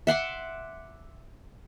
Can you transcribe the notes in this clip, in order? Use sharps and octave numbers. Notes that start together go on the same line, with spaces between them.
E5 F#5 C6 D6